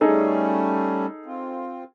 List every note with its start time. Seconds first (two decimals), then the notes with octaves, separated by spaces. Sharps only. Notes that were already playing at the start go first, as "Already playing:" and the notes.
0.01 G3 A3 C#4 D#4 G#4 A4
1.26 C4 F4